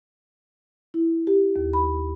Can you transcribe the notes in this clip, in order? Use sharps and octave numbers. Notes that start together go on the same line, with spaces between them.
E4
G4
D#2
B5